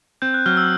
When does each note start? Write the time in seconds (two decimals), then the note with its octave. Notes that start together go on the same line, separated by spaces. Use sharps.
0.22 C4 G6
0.34 F#6
0.46 F#3 F6
0.57 E6